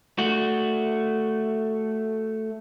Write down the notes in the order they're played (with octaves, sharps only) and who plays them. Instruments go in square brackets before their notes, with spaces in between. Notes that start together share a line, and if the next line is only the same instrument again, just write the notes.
[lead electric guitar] A3 F#4